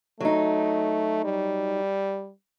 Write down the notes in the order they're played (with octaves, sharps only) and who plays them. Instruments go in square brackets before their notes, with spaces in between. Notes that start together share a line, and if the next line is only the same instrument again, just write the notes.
[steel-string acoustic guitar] F#3 D#4 [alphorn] A3
[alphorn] G3